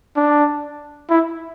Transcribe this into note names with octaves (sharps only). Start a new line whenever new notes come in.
D4
E4